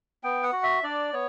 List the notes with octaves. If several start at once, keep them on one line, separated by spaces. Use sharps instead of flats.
B3 G5
F#5
F#4
E5
D4 D5
B3 C#5